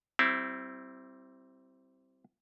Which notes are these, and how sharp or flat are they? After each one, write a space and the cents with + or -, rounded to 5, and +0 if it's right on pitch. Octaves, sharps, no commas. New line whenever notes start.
G3 -25 C4 +0 E4 +5